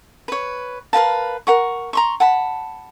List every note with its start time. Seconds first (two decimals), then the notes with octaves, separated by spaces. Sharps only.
0.28 B4 C#5
0.93 A#4 B4 F5 A5
1.47 A#4 F#5 C#6
1.93 A#5 C6 C#6
2.20 F#5 A5 B5